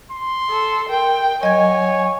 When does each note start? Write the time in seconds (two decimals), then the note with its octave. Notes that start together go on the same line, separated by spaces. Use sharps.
0.12 C6
0.50 A4
0.89 A#4 G5
1.43 F#3 C#5 D#5 G#5 G#6